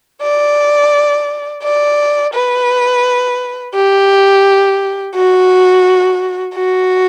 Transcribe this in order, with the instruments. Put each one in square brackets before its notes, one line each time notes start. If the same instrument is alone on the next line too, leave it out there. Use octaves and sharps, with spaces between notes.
[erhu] D5
D5
B4
G4
F#4
F#4